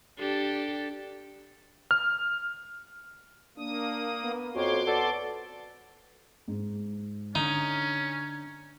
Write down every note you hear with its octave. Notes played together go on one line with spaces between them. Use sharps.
D4 G4 A4
F6
A#3 D4 D#6
B3
F2 F#4 C#5 C6 D6
B3 A4 D5
G#2
D3 C#4 D#4